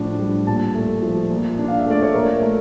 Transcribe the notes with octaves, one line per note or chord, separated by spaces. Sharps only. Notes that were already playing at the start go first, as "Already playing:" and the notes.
Already playing: A2 F3 D4
G3
A#2 A5
A3
F3
A#2
D4
F5
E5
A3 D5
C#5
A#2 A#4
A3